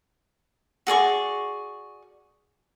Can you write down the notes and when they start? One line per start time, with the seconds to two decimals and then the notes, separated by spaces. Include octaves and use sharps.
0.87 F#4 G#4 D5 C#6